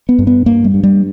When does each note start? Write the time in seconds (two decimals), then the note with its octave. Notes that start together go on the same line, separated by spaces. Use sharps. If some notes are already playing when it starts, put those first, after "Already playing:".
0.09 B3
0.19 G2
0.27 B3
0.46 G2 A#3
0.64 G3
0.74 G2
0.83 G3